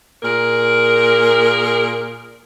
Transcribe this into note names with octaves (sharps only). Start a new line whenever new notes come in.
A#2 G#4 A#4